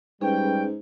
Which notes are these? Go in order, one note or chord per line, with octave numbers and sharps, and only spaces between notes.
G#2 G3 C#4 G#4 B4 G5